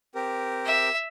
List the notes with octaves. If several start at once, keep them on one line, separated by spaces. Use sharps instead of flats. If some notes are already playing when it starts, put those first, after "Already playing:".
C4 G4 A#4
E5